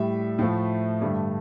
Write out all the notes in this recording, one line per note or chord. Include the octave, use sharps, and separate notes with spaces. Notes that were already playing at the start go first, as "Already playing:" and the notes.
Already playing: A2 G3 E5
A2 F3 A3
G2 D3 A3